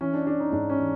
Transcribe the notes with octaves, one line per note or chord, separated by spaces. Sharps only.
E3 C#4
D4
E3 D4
D#4
G#2 D4
C#4
E3